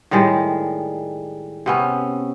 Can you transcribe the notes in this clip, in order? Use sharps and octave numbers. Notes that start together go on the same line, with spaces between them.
A2 D#3 G3 G#3
C3 B3 C#4